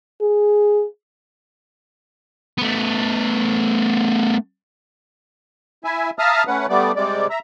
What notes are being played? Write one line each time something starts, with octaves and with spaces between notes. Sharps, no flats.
G#4
A3 B3
E4 E5 G#5
E5 F5 A5 A#5 D#6 F6
A3 C#4 B4 F#5
G3 A3 B3 D5
C3 G3 G#3 D5
E5 A#5